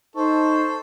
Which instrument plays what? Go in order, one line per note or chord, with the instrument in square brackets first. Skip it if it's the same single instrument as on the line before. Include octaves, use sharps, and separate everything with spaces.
[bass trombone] D#4 [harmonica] A4 [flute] C5 [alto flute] C#6